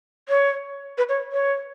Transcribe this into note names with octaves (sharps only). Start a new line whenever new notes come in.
C#5
B4
C#5
C#5